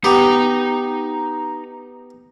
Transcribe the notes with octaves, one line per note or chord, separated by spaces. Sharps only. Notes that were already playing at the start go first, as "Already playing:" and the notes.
B3 D#4 G4 A#5